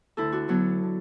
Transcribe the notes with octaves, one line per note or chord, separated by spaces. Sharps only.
D2 D3 E4 A4
D4 F#4
D2 D3 F#3 B3
D3